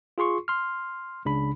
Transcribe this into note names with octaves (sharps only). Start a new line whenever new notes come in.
F4 G#4 C6 C#6
C6 F6
C#2 C#3 D4 B5